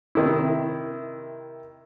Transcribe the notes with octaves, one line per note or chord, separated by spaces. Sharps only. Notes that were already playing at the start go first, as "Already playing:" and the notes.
C3 D#3 E4